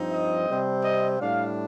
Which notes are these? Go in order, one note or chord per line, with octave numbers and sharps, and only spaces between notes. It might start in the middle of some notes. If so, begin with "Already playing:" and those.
Already playing: G2 F3 C4 D#4
D#5
C3 G3 C4
D#5
A2 G3 D4 F5